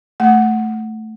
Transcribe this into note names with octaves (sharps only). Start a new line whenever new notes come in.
A3 F#5